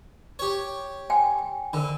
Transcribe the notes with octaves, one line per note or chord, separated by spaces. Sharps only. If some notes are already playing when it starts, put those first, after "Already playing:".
G4 C#5
G5 G#5
D3 A#4 B5